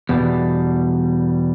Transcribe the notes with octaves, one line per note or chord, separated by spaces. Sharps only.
E2 B2 G3